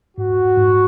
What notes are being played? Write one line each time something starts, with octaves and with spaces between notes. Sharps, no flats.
G#2 F#4
G#2